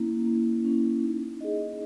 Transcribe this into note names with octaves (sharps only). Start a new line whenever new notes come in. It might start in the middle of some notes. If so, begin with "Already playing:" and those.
Already playing: A#3 C#4 E4
A#3
C#4 E4
D#4
G#4 D#5